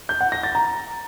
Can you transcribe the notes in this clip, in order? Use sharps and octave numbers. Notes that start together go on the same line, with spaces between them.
G6
F#5
A#6
A6
A#5